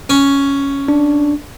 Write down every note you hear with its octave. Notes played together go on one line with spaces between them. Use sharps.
C#4
D4